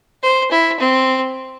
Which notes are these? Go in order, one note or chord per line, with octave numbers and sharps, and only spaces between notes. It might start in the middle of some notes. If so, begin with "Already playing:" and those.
C5
E4
C4